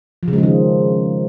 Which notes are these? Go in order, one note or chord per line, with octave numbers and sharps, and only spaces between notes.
F3
C#3
G#3
F3
D#3